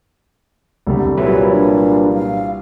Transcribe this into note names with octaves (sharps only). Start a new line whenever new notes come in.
C2 D3 G3
A#2 F#3 E4 B4 C#5
D4
F5